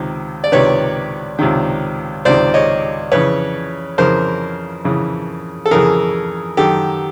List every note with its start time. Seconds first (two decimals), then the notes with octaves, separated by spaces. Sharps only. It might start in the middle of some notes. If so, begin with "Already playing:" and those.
Already playing: C#2 C3 D#3
0.44 D5
0.52 C#2 C3 D#3 B4 C#5
1.39 C#2 C3 D#3
2.25 C#2 C3 D#3 C5 D5
2.54 C#5 D#5
3.11 F2 C#3 E3 B4 C#5
3.98 F2 C#3 E3 A#4 C5
4.85 F2 C#3 E3
5.66 A4
5.71 F2 C#3 E3 G#4 A#4
6.57 F#2 D#3 G4 A4